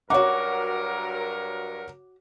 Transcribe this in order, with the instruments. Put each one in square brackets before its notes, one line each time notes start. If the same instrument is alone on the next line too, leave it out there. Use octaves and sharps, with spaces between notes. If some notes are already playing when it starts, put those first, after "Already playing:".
[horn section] G2 F#3 A#4 [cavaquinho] D#4 F#4 [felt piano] C#5 F#5 [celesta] D6